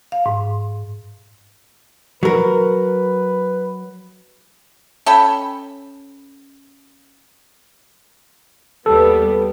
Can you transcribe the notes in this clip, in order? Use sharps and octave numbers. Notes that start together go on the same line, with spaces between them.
F5
G#2
F#3 A#4 B4
C#4 A4 G5 B5
D#2 G3 B3 A4